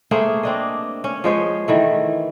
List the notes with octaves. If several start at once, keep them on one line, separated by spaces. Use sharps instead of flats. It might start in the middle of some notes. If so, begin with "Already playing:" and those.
A3 A#3 G#4 C5
C4 D4 D#5
C#4
F3 G#3 C5 C#5
D#3 E3 A3